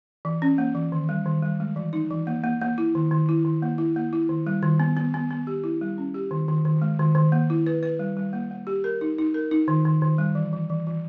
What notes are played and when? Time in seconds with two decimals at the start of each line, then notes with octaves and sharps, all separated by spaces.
0.25 E3
0.42 C#4
0.58 A#3
0.75 E3
0.92 D#3
1.09 G3
1.26 D#3
1.42 G3
1.60 G#3
1.76 E3
1.93 D#4
2.11 E3
2.27 A#3
2.44 A#3
2.61 A#3
2.78 E4
2.95 D#3
3.11 D#3
3.29 E4
3.45 D#3
3.62 A#3
3.78 E4
3.96 A#3
4.13 E4
4.29 D#3
4.46 G3
4.63 D#3
4.80 B3
4.97 B3
5.14 B3
5.31 B3
5.47 G4
5.64 E4
5.81 G3
5.98 C#4
6.14 G4
6.31 D#3
6.48 D#3
6.65 D#3
6.82 G#3
6.99 D#3
7.15 D#3
7.32 A#3
7.50 E4
7.66 B4
7.83 B4
7.99 G3
8.17 G3
8.33 A#3
8.51 A#3
8.67 G4
8.84 A#4
9.01 D#4
9.18 D#4
9.34 A#4
9.51 D#4
9.68 D#3
9.85 D#3
10.02 D#3
10.18 G3
10.35 E3
10.53 E3
10.70 E3
10.87 E3